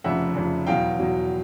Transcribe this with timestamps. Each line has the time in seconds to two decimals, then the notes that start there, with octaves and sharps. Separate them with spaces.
0.04 F1 F2 C#3 E5 F#5
0.35 F1 F2 C#3
0.67 E2 B2 F#3 F5 G5
0.98 E2 B2 F#3